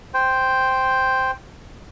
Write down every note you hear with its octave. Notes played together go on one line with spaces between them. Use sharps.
C5 G5